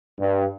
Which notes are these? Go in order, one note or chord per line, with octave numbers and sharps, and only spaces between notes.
G2